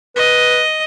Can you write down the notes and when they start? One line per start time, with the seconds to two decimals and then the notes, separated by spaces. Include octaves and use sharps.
0.16 B4 D#5